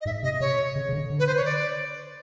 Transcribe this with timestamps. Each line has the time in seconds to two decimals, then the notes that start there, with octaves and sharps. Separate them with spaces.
0.01 D#5
0.06 G#2 E5
0.23 C3 D#5
0.40 C3 C#5
0.76 C#3
0.89 C#3
0.93 D3
1.10 D3
1.19 B4
1.27 C5
1.37 C#5
1.45 D5